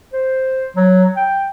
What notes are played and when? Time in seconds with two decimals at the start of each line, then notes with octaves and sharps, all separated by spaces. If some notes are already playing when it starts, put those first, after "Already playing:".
0.13 C5
0.76 F#3
1.16 G5